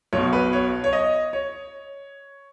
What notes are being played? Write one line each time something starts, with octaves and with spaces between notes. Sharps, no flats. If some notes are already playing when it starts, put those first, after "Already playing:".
B1 B2 C#5
B4
C#5
C#5
D#5
C#5